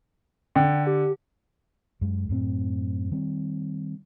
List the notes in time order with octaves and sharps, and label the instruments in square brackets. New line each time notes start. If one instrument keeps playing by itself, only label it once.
[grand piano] D3 [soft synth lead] G5
[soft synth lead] G4
[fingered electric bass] F#2 G#3
F#2 A2 C4
D#3 G3 C4